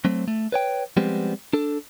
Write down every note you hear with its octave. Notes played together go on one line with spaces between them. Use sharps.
F#3 A3 C4
A3
B4 C#5 G5
F3 G3 G#3 B3 C4 G4
D4 A4